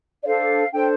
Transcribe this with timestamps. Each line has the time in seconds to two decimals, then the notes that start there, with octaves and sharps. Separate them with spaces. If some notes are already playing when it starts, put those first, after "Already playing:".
0.21 D5
0.25 D4 A4 C5 F5
0.72 D4 A4 C5 G5